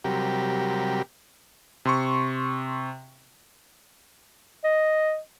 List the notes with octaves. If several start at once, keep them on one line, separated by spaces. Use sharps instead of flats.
C3 F#3 G3 G4 A#4
C3 C6 C#6
D#5